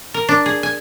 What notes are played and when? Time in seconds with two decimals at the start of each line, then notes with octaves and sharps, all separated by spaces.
0.14 A#4
0.29 D4
0.46 G#4
0.63 G#5